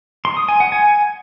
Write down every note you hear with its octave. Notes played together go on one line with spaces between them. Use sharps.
C6
D#6
G#5
F#5
G#5